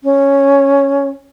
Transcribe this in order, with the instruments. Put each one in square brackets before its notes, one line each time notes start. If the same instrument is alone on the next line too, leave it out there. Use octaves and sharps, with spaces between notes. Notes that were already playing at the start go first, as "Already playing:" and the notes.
[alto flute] C#4